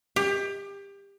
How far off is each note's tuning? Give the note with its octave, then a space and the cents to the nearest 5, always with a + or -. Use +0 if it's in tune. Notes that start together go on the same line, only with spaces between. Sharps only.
G4 +25